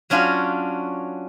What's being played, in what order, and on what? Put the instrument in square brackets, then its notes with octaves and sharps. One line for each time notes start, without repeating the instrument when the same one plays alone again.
[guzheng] F#3 C#4 D4 F4 F#4